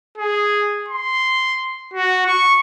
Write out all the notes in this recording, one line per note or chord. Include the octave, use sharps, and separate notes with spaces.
G#4
C6
F#4
C#6